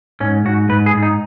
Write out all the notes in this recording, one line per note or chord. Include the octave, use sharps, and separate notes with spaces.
G#2 C#4
G#2 F#4
G#2 B4
G#4
G#2
D#4